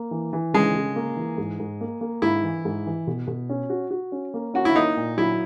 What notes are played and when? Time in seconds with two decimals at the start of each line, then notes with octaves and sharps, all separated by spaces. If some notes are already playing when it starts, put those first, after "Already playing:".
Already playing: A#3
0.11 E3
0.33 E3
0.54 C#3 G#3
0.75 C#3
0.96 A#3
1.17 E3
1.38 G#2
1.60 G#2
1.81 A#3
2.01 A#3
2.22 G#2 E4
2.44 E3
2.65 G#2
2.86 E3
3.07 B2
3.27 B2
3.50 C#4
3.70 F#4
3.91 F#4
4.12 C#4
4.34 A#3
4.54 C#4 F#4
4.65 E4
4.76 A#3 D#4
4.97 A#2
5.17 F#3 E4